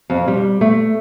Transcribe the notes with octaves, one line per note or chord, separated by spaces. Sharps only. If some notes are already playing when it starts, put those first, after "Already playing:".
F2
G3
A3